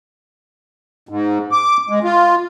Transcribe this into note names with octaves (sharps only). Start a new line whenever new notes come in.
G#2
D6
G#3
F4